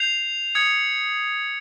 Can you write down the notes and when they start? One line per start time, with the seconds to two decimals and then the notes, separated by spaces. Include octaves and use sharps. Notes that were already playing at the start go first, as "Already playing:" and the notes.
Already playing: G6 C7 F7
0.55 D#6 G#6 C#7